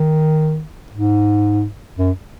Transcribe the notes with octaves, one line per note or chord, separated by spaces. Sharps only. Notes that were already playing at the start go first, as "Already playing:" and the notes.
Already playing: D#3
G#2
F#2